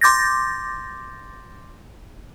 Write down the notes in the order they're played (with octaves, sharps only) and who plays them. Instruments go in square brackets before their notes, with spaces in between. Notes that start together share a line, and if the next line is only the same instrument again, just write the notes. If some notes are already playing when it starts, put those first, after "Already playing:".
[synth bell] C6 D6 G6 A6 A#6